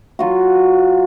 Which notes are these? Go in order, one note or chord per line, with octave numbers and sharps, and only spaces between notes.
F#3 F4 F#4